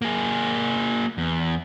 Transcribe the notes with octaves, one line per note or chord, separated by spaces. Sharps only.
A#3 G#4
E2